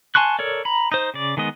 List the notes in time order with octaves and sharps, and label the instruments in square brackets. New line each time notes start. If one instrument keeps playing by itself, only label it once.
[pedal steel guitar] G#5 A5 C6 C#6 F#6
A4 A#4 C#5 D5
A#5 B5
D#4 C5
C#3 D5
D#3 G#3 B3 D#5